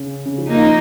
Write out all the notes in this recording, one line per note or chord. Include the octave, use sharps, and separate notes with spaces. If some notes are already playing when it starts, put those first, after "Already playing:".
Already playing: C#3
C#3
F3
A#3 D#4